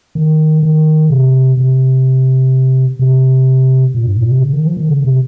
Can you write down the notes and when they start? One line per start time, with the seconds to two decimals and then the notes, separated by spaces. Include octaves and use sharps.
0.15 D#3
0.63 D#3
1.10 C3
1.57 C3
2.99 C3
3.95 A#2
4.06 G2
4.17 A#2
4.29 C3
4.41 C#3
4.53 D#3
4.65 F3
4.77 D#3
4.89 C#3
5.04 C3